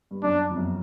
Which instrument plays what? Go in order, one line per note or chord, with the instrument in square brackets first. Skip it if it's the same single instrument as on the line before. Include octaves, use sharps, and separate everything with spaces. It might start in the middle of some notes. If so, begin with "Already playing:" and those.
[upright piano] G2
[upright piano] F#2 [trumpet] D4
[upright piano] F2
F#2